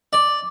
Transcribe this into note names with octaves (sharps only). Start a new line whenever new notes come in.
D5